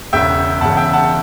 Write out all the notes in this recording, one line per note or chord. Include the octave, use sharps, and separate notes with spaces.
E1 E2 C#3 E5 G5
E1 E2 C#3 F#5 A5
E5 G5
F#5 A5